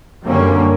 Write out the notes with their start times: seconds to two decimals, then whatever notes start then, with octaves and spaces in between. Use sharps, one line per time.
0.24 F#2 D3 G3 A#3 C#4